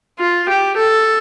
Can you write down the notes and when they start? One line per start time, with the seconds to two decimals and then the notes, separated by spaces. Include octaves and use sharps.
0.19 F4
0.49 G4
0.77 A4